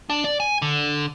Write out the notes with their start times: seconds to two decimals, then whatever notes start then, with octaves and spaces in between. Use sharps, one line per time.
0.10 D4
0.24 D5
0.40 G#5
0.62 D3